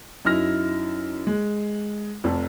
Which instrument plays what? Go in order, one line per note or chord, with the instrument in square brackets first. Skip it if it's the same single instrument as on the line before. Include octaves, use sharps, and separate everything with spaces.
[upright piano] F#2 D#4 E4 F6 A#6
G#3
F1 F2